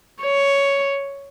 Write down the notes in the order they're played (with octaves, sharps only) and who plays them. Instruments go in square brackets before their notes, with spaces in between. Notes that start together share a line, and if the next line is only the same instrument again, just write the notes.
[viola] C#5